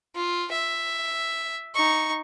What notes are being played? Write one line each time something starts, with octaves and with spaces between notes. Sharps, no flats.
F4
E5
D#4 C#6